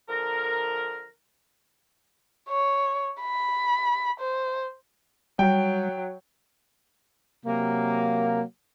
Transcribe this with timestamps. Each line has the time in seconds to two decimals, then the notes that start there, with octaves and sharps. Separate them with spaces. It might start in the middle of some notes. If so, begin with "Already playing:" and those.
0.09 D3 F3 A#4
2.49 C#5
3.21 B5
4.20 C5
5.39 F#3 G3 G5
7.46 C3 F#3 A#3